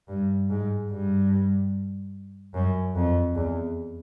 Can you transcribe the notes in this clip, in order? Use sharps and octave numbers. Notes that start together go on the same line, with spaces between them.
G2
G#2
G2
F#2
F2
E2